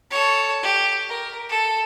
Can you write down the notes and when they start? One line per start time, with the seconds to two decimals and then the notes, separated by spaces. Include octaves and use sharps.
0.11 A4 C#5
0.62 G4
1.09 A#4
1.49 A4